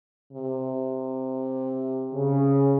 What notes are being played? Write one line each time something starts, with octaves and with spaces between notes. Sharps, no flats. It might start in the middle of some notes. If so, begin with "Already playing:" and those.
C3
C#3